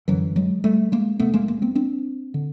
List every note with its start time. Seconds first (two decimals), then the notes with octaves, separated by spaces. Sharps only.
0.08 F#2 D3 E3 F#3
0.36 F#3 G#3
0.64 G3 A3
0.92 G#3 A#3
1.19 E2 C3 A3 B3
1.34 G#3 A#3
1.48 G#3 A#3
1.62 A#3 C4
1.75 C4 D4
2.34 D3